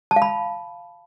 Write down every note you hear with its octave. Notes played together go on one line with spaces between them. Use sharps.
A5
F5
B5